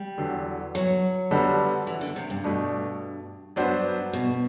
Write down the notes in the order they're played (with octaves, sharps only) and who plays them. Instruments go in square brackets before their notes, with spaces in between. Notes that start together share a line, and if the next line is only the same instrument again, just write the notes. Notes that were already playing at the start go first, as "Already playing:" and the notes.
Already playing: [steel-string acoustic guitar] G3
[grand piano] E2 D3 F#3
[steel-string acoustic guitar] F#3
[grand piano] D3 G3 B3 F#4 A4
[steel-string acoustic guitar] E3
D3
C3
G2
[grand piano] B2 A3 D4
[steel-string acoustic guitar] G2 [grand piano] F#3 B3 D4 F#4 C5
[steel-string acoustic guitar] B2